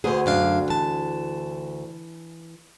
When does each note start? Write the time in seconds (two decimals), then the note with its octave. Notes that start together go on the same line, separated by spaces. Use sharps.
0.04 D2 B3 G#4 A#4 C5
0.26 F#2 D4 F5
0.68 E3 A5